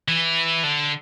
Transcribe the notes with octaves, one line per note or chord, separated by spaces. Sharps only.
E3
D3